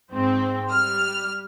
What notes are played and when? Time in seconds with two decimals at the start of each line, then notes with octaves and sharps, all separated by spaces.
0.10 G#2 C4
0.69 G3 F6